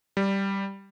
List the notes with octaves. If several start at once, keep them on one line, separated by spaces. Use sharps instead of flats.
G3